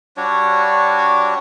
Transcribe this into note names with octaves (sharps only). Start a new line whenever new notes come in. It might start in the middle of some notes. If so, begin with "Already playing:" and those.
G3 D4 F#4 C#5